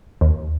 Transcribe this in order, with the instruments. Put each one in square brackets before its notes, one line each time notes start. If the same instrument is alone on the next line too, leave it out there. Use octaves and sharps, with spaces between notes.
[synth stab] D#2